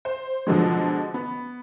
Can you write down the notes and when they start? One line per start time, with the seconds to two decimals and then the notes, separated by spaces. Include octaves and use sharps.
0.05 C5
0.47 B2 D3 F3 F#3 G#3
1.14 B3